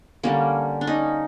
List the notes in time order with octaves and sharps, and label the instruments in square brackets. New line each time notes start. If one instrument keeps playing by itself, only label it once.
[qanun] D3 G3 A#3 C#4
D4
C#4 D#4